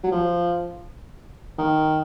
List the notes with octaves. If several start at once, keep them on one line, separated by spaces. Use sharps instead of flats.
F#3
F3
D#3